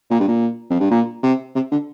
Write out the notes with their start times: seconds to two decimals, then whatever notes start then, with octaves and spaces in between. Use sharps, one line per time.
0.10 A#2
0.20 G2
0.28 A#2
0.70 F2
0.80 G2
0.91 A#2
1.23 C3
1.55 C3
1.72 D3